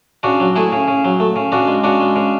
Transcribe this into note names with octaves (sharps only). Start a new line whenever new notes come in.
C#3 D4 F#4
F#3
A3 E4 G#4
C#3
C#3
F#3
A3
C#3
C#3 D4 F#4
G#3
C#3 D4 F#4
G#3
C#3